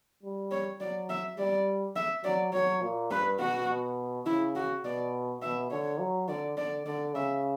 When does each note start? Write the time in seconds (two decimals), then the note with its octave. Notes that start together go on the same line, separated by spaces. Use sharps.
0.23 G3
0.51 C#5
0.80 F#3 D5
1.09 E5
1.38 G3 D5
1.96 E5
2.24 F#3 D5
2.53 F#3 C#5
2.82 A#2
3.11 G2 B4
3.40 B2 F#4
3.68 B2
4.26 C#3 E4
4.55 F#4
4.84 B2 D5
5.42 B2 E5
5.71 D3 C#5
6.00 F#3
6.28 D3 D5
6.57 D3 D5
6.86 D3 D5
7.14 C#3 E5